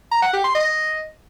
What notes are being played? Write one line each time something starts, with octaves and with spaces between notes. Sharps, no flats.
A#5
F#5
G4
C6
D#5